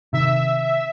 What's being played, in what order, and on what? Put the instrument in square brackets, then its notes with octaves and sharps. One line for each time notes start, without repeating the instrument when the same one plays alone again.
[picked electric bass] C3 D#3 [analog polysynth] E5